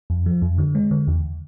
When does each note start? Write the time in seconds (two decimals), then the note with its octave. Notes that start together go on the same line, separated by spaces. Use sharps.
0.10 F2
0.26 F3
0.42 F2
0.58 D3
0.75 G#3
0.91 D3
1.07 E2